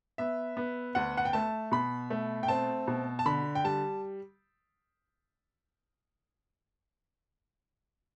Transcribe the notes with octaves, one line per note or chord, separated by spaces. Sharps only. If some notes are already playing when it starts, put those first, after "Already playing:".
B3 E5
B3
D2 F#5
F#5
G5
A3 A5
B2 B5
A3
G5
C4 A5
B2
A5
D3 B5
G5
G3 A5